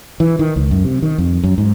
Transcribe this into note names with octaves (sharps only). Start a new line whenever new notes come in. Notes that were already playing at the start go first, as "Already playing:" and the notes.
E3
D#3
C#2
F#2
C3
D#3
F2
F#2
G#2